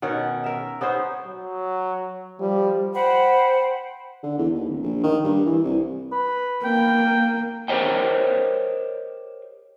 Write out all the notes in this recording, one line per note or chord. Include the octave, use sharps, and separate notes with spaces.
B2 D#3 C#4 F#5
A#4 E5
B3 C#4 D#4 C5
F#3
F3 G3
C5 F#5 G5 B5
D3
E2
D#2
D1
A#1
D#3
G2
E3
C2
B4
A#3 G5
G4 A#4 C5 C#5 D#5 G5